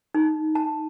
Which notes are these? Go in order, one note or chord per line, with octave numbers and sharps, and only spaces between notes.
D#4
A5